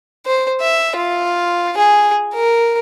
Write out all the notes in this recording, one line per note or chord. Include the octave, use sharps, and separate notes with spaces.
C5
E5
F4
G#4
A#4